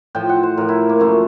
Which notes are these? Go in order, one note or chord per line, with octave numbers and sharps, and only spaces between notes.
A2 F3 G5
F#5
C5
A2 F3 A#4
E4
A#3
F#2 C#3 F3 A3